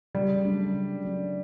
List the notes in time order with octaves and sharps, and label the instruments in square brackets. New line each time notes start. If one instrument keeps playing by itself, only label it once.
[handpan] C#3 [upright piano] G3
[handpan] F#3 A3 D4
C#3
F#3 A3 D4